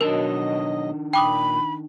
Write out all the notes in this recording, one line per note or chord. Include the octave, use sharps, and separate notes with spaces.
B2 D#3 F#3 D4 A#4 D#5 A5
A#2 G5 B5 D6 D#6